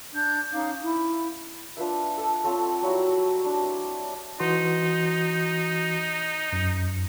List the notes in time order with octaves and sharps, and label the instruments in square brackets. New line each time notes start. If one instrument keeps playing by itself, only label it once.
[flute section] D4 G6
C#4 D#4 F5 D6
E4
[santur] D4 F4 B4 E5
A4 A5
C4 F4 A4 C#5
F#3 G3 E4 F#4
D4
C5
[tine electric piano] E3 F#4 C6 [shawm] D#4
[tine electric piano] F#2